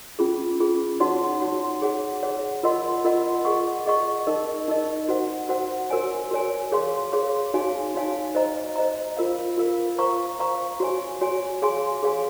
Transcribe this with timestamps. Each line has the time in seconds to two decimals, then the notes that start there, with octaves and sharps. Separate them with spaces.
0.19 C#4 F4 G#4
0.60 C#4 F4 G#4
1.00 D#4 F#4 C#5 F#5 C6
1.40 D#4 F#4 C#5 F#5 C6
1.82 G#4 C#5 F#5
2.23 G#4 C#5 F#5
2.63 F4 A#4 D#5 F#5 C6
3.04 F4 A#4 D#5 F#5 C6
3.45 G#4 D#5 F#5 C#6
3.86 G#4 D#5 F#5 C#6
4.27 D#4 A#4 D#5
4.68 D#4 A#4 D#5
5.09 F#4 C5 F#5
5.49 F#4 C5 F#5
5.90 F#4 A#4 C#5 G#5
6.31 F#4 A#4 C#5 G#5
6.72 G#4 C#5 F5 C6
7.12 G#4 C#5 F5 C6
7.54 D#4 F#4 C#5 F5 G#5
7.94 D#4 F#4 C#5 F5 G#5
8.35 C5 D#5 A#5
8.76 C5 D#5 A#5
9.17 F4 A#4 F5
9.57 F4 A#4 F5
9.98 C5 F5 A#5 C#6
10.39 C5 F5 A#5 C#6
10.80 F#4 C#5 G#5
11.21 F#4 C#5 G#5
11.62 G#4 C#5 F5 G#5 C6
12.03 G#4 C#5 F5 G#5 C6